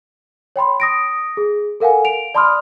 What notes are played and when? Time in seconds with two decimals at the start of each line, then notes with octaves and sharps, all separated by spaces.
0.56 C#5 G5 B5 C6
0.80 D#6 A#6 D7
1.37 G#4
1.80 A4 A#4 F5 F#5 G#5
2.05 D7 F7
2.35 D5 A5 B5 C6 D#6 F6